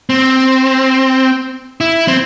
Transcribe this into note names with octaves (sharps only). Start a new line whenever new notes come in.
C4
E4
C4